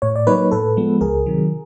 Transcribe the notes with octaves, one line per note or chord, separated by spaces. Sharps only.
A2 C#5
D5
F#3 A#3 D#4 B4 C#5
A2 A4 B4
F3 G#3 B3
C#2 G#4 A#4
C3 D#3 F#3